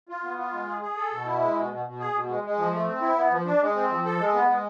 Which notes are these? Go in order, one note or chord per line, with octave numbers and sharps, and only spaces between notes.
F4
B3
F4
G#3
G#4
G#4
A4
B2
E4
G#3
B2
B2
B2
G#4
B2
G#3
G#3
F3
A3
C4
E4
B3
F3
D4
G#3
C4
F3
A4
G#3
B3
G#3